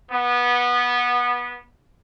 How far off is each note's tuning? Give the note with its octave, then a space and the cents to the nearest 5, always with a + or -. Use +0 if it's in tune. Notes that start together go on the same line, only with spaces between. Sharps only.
B3 -20